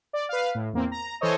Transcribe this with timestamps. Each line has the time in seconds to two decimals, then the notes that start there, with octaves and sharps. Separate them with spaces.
0.13 D5
0.29 B4 F5
0.55 A2
0.73 E2 A#3 C4
0.91 A#5
1.21 E3 A4 C5 C#5 D#5